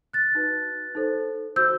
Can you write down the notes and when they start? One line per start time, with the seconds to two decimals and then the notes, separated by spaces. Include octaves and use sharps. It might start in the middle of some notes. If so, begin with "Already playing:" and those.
0.13 F#6 A6
0.35 D#4 F#4 B4
0.95 D#4 A4 C5
1.56 F#4 C5 E6 G6